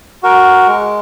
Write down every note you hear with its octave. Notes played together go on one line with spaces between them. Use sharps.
F#4 A#4
G#3